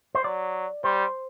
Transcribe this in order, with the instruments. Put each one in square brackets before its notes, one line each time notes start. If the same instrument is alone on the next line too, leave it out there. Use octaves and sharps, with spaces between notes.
[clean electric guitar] C5
[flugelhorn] F#3 [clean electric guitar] D5
[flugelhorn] G3 [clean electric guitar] C5